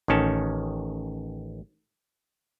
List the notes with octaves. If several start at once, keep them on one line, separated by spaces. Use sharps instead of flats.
A1 D#3 C#4 A5